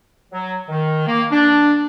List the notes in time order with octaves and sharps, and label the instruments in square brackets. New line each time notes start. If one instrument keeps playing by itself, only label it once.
[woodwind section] F#3
D#3
A#3
D4